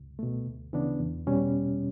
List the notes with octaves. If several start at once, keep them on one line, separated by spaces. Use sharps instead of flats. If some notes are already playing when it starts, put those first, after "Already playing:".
Already playing: C#2
B2 A3
D2
C#3 E3 B3 D4
E2
B2 G3 C#4